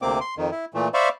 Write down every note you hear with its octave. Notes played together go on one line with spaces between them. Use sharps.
D2 C3 A#3 C4 D6
C6
F2 D#3
E4
A#2 E3 A3
C5 D5 E5 F5 B5 C#6